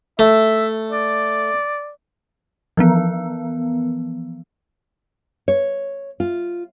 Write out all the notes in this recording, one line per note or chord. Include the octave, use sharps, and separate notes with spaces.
A3 E5
D5
E3 F3 B3
C#5
F4